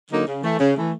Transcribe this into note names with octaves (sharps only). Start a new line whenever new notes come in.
D3 F#3 A#3 D#4
C#3
E3 A3
C#3
E3 A3